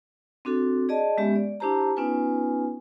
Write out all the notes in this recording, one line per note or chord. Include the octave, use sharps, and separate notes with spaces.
C4 D4 F#4 A4
G#4 D5 D#5 A5
G#3 B3 C#4 G4 E5
D5
D4 E4 G4 C5 A5 A#5
B3 C#4 D#4 F4 B4 G#5